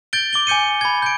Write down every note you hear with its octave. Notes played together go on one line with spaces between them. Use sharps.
G6 A6 D7 G7
D6 D7 G7
G#5 D6 G6 C#7 D#7
B5 G#6
G6 D7